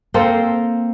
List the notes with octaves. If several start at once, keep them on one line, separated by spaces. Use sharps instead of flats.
A#3 C4 A4 C5